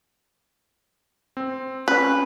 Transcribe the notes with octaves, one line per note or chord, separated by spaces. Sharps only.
C4
C#4 B4